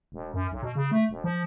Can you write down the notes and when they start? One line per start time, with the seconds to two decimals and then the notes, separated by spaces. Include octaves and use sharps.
0.12 E1
0.34 F#2
0.51 B1
0.63 B2
0.75 C#3
0.91 A3
1.09 E1
1.24 F3